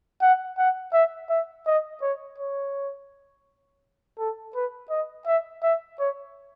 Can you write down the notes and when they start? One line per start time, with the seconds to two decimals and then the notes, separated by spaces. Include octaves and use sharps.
0.22 F#5
0.58 F#5
0.93 E5
1.29 E5
1.66 D#5
2.02 C#5
2.38 C#5
4.19 A4
4.55 B4
4.90 D#5
5.26 E5
5.63 E5
5.99 C#5